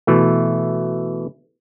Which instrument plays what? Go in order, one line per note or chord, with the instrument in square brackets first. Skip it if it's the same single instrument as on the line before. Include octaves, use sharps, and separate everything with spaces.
[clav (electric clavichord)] B2 E3 A3